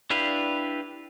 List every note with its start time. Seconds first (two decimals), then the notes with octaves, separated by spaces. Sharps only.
0.10 D4 E4 G4 B4 F5